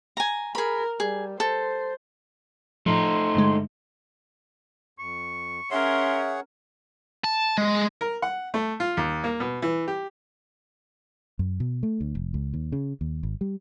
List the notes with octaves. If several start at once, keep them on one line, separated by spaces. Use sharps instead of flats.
G#5 A#5
G#4 A#4 B5
G3 G#4
A4 C5
A2 F3 A3 D#4 C6
G2 D3 G#3
F2 C#6
C#4 G#4 A#4 C#5 E5 F#5 C6
A5
G#3
A#4
F#5
A3
F4
D#2
A#3
B2
E3
G4
F#2
B2
A3
D2
F1
C#2
D#2
C#3
D#2
G#1
G3